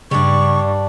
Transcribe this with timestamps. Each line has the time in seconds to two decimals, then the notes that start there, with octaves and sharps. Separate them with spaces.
0.11 G2 C#3 G3 D4 C#6